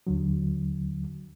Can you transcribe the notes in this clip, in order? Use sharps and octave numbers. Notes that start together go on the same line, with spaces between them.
D#2 D3 F#3